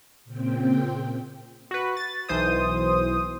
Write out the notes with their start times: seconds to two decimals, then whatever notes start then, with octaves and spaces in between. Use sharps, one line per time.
0.25 A#2 C#3 C4 G5
1.71 F#4 B4
1.97 A6
2.29 B1 E3 C5 D#6